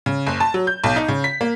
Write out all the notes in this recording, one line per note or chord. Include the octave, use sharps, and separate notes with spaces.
C#3
F#1
A5
F#3
G6
B1
D#4
C#3
B6
A#3